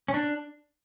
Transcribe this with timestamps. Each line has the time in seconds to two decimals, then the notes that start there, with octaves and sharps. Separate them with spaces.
0.08 C#4
0.14 D4